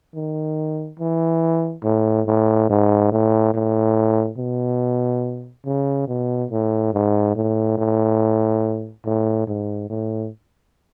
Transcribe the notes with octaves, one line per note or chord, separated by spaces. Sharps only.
D#3
E3
A2
A2
G#2
A2
A2
B2
C#3
B2
A2
G#2
A2
A2
A2
G#2
A2